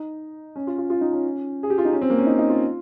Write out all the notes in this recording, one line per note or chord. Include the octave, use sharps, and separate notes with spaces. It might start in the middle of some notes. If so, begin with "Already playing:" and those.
Already playing: D#4
C#4
F4
F4
F4
D#4
C#4
G#4
G4
F4
D#4
C#4
C4
A#3
C#4
D#4
D#4
F4